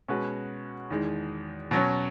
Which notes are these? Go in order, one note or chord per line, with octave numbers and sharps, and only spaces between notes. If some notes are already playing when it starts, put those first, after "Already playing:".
B2 G#3 C#4 F#4 B4
E2 D#3 G#3
B2 F#3 C#4